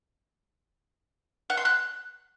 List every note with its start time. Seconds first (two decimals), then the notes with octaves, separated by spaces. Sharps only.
1.50 F#5
1.57 C6
1.65 F#6